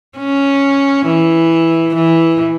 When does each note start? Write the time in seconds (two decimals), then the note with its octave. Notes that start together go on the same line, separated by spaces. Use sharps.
0.18 C#4
1.06 E3
1.95 E3